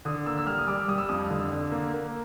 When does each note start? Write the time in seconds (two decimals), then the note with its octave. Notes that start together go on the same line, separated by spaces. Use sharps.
0.05 D3 D#6
0.26 A#3 E6
0.38 E6
0.47 G3 F6
0.58 D#6
0.68 G3 D6
0.88 G3 D#6
0.98 E6
1.09 F2 D#6
1.30 D3
1.52 D3
1.71 A#3
1.93 A#3